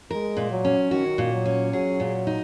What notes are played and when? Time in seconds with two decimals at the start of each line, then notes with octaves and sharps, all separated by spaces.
0.11 G#3 A#4
0.37 A#2
0.51 F#3
0.65 C#4
0.91 D#3 F#4
1.18 A#2
1.33 F#3
1.46 C#4
1.72 F#3 G#4
2.00 A#2
2.27 D#4